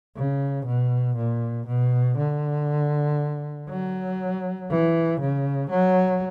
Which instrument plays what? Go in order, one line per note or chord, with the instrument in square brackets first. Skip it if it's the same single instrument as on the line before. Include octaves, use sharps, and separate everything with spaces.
[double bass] C#3
B2
A#2
B2
D3
F#3
E3
C#3
F#3